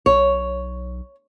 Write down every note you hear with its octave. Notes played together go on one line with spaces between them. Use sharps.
B1 C#5